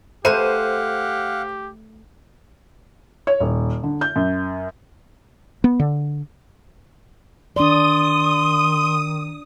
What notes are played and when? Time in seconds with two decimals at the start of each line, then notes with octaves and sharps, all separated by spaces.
0.25 A3 G4 B4 C5 F5 F#5 G#5 D#7
3.27 C#5
3.40 D#1
3.83 D3
4.01 G6
4.16 F#2
5.64 B3
5.80 D3
7.56 D#3 D4 D5 C6 D#6